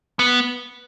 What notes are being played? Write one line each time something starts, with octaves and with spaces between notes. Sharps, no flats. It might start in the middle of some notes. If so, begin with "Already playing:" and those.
B3